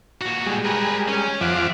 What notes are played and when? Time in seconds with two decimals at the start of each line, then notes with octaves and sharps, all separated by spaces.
0.21 A#2 F#4
0.46 G3 G#3
0.65 A#4 B4
1.08 C#4
1.41 F2 F3 E5 F#5 D6